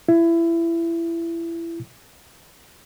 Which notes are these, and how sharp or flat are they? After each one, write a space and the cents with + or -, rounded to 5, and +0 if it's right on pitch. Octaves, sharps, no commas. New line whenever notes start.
E4 +25